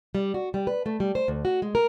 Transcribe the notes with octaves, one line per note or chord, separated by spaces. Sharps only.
G3
F#4
G3
B4
A3
G3
C5
D2
F#4
G#3
A#4